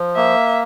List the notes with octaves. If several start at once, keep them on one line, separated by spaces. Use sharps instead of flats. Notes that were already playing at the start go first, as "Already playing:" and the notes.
Already playing: F3
A#3 E5